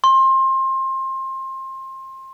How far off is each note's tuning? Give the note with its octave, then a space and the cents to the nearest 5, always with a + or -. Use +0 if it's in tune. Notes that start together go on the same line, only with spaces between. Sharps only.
C6 +25